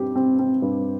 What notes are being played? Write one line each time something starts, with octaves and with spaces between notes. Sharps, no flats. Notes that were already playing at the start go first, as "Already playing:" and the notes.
Already playing: G2 C4 G4
C4
C4
G2